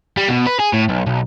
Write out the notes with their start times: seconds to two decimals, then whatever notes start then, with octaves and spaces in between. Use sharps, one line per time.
0.17 G3
0.28 B2
0.46 B4
0.59 G#4
0.73 A2
0.89 B1
1.06 B1